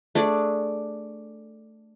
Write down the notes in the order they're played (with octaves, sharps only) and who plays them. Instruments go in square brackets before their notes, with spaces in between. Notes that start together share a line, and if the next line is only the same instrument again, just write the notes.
[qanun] A3 D4 G#4 D5